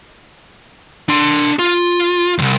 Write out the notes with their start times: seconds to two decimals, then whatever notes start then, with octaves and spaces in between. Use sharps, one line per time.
1.09 D4 C6
1.59 F4
2.38 C2 F#2